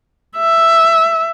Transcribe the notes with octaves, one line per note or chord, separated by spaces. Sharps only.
E5